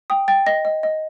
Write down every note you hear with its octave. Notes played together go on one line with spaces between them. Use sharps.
G5 D#6
G5 A6
D#5 A#6
D#5
D#5